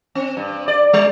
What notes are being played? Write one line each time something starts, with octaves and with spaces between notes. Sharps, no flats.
C4
G2
D5
G3